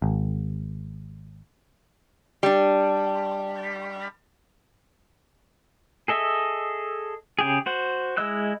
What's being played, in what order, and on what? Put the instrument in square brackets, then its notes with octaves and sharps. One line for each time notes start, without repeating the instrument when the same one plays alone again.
[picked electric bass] G#1
[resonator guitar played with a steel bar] G3 D4
[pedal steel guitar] G#4 A4 D#5 E5
C#3 G4 G#4
F#4 C5 F#5
G#3 E4 D#5 E6 F#6